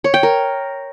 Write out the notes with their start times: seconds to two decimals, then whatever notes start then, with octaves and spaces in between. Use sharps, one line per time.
0.04 C#5
0.14 G5
0.23 A#4